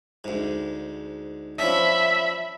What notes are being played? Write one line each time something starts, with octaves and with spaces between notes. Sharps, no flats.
D2 G#2
F3 C#4 D4 E5 B5